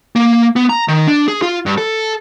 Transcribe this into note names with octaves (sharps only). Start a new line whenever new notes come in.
A#3
B3
A#5
D#3
D4
G#4
F4
G2
A4